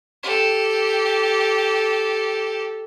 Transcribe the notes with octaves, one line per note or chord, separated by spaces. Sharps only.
G4 A4